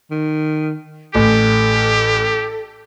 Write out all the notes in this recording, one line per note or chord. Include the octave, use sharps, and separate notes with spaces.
D#3
A1 G4 A4